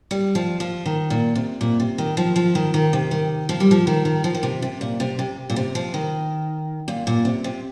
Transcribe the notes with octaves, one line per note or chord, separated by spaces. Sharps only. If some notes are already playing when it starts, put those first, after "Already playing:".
G3
F3
F3
D#3
A#2
C3
A#2
C3
D#3
F3
F3
D#3
D#3
C3
D#3
F3
G3
F3
D#3
D#3
F3
D#3
C3
C3
A#2
C3
C3
A#2
C3
F3
D#3
A#2
A#2
C3
C3